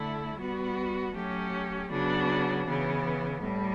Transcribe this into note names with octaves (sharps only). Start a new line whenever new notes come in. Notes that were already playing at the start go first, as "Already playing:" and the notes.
Already playing: D3 A3 E4
G3 B3 F#4
F#3 A3 C#4 G4
C#3 F#3 B3 D4 F#4
C#3 E3 B3
A2 G3